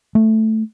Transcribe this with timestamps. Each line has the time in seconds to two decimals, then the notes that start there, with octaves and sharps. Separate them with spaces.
0.15 A3